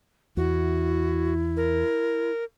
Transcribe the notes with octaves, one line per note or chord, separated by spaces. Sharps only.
E2 E4 F#4
A#4